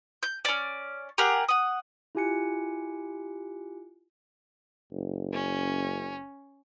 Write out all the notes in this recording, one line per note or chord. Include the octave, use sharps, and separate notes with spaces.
G6
C#4 D5
G4 G#4 A#4 F#5
F#5 D#6
E4 F4 G4 G#5 F#6 C#7
F#1
C#4